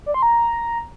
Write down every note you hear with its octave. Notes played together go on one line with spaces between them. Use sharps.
D5
C6
A#5